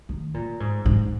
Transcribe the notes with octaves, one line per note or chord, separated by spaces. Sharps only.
D#3
A#2
G#2
G#2